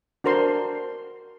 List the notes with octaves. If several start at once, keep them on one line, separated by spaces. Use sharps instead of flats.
D4 F#4 A#4 C5 C6